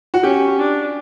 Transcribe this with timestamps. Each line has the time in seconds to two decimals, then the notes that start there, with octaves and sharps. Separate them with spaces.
0.14 F#4
0.23 C#4 G4
0.59 D4